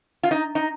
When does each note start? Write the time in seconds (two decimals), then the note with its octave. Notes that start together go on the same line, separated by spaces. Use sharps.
0.23 F4
0.31 D#4
0.55 D#4